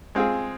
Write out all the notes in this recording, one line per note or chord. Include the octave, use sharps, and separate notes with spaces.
G#3 C4 F4 G#4